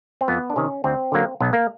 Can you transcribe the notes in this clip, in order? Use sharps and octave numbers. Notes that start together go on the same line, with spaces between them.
C4
F2 B3
D4
C3 D#3 C#4
D2 C4
D3 F#3 A#3
B1 B3
A#3